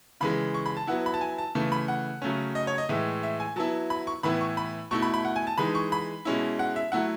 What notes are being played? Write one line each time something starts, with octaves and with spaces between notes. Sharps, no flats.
C#3 E3 G#3 B5
C#6
B5
A5
F#3 B3 E4 F#5
B5
A5
G#5
A5
C#3 E3 A3 A5
B5
F#5
C#3 F#3 A3 C#4
D#5
C#5
D#5
A2 E3 G#3 E5
E5
G#5
F#3 B3 E4 A5
B5
C#6
A2 E3 B3 E4 B5
C#6
B5
B2 A3 E4 C#6
B5
B5
F#5
G#5
A5
E3 G#3 D#4 B5
C#6
B5
B2 G#3 C#4 E4
F#5
E5
F#3 A3 E4 F#5